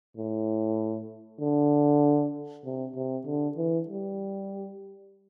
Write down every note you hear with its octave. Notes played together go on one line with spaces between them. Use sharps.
A2
D3
C3
C3
D3
E3
G3